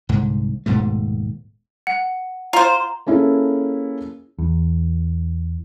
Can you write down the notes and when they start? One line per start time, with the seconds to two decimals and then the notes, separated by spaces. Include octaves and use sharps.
0.09 C2 G#2 D3
0.66 D#1 G#2 B2 A3
1.87 F#5
2.53 F4 C5 A#5
3.07 A#3 C#4 E4 G#4 A4
4.38 E2